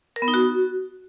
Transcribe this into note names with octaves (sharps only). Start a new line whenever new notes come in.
A#4
B3
D#4
F#4